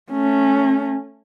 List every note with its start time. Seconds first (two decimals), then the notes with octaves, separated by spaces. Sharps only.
0.11 A3 C#4